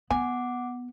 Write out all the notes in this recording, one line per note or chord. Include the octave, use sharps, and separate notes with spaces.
B3 F#5 G#5 D6